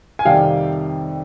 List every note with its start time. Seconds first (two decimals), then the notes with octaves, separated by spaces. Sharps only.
0.19 G#5
0.25 F2 C3 D#3 G3 F5 G5